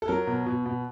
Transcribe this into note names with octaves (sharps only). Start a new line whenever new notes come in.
A4
F#3 A#4
B2
B2
B2